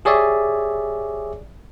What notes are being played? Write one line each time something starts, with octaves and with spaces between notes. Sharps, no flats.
G4 G#4 C#5 D5 E5